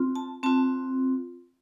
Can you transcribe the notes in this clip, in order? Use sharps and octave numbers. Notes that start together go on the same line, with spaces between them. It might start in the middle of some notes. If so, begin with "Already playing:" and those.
Already playing: C4 F4
A5
C4 F4 A5